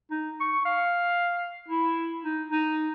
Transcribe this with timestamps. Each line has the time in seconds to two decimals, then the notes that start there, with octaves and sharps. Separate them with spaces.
0.11 D#4
0.40 C#6
0.65 F5
1.68 E4
2.25 D#4
2.50 D#4